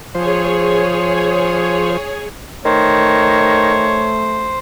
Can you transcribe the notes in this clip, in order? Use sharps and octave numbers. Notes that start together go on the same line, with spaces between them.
F3 G#4 C5 C#5
D#3 A3 C5 C#5